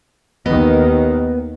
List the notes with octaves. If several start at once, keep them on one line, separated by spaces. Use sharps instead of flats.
D#2 D#3 B3 B4 D#5